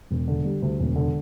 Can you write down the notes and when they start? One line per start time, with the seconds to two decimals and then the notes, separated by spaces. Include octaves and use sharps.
0.11 E1
0.28 D3
0.45 G3
0.62 D2
0.79 E1
0.96 D3